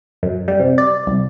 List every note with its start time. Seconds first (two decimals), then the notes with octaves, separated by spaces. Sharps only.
0.23 F#2
0.48 G3
0.60 C3
0.78 D5
1.07 C2